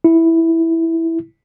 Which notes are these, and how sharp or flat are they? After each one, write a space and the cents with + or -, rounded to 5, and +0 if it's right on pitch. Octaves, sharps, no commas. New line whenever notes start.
E4 -5